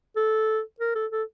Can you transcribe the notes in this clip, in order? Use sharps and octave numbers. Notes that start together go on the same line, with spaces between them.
A4
A#4
A4
A4